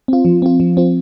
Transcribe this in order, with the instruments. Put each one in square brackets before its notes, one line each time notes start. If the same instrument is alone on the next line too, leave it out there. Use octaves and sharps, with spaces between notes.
[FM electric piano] C4 F4
F3
C4 F4
F3
C4 F4